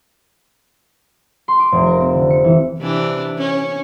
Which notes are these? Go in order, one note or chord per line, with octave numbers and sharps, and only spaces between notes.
C6
D6
F1
A#4
C4
D3
C#7
E3
C3 E3 D4
C#4